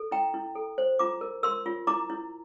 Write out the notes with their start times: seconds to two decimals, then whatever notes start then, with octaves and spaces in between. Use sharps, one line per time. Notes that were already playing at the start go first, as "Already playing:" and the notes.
Already playing: A4
0.11 E4 G5 A#5
0.34 E4
0.55 A4
0.78 C5
0.99 F4 A#5 D6
1.21 A#4
1.43 A#4 C6 E6
1.66 F4
1.87 E4 A#5 D6
2.10 E4